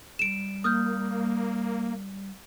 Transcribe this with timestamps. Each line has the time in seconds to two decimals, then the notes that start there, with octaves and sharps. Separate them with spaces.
0.19 G3 D7 E7
0.64 A#3 D#6 F6 G6